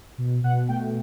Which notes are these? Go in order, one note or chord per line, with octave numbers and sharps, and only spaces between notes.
B2
B2 F#5
A3 G5